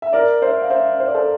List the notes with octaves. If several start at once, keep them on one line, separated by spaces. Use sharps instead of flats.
E5
A#4 D5
C5 E5
F5
C5 E5
C5
D5
A4 C5